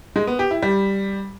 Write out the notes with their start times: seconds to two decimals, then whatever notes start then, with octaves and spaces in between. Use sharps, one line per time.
0.16 G#3
0.27 B3
0.39 G4
0.51 E4
0.63 G3